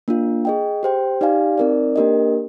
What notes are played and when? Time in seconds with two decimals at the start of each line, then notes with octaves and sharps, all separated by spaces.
0.08 A#3 D4 F4
0.45 G#4 D#5 G5
0.83 G4 C5 G5
1.21 D#4 G4 D5 F5 G#5
1.58 C4 D#4 A#4 D5
1.96 A#3 D4 G4 A#4 D#5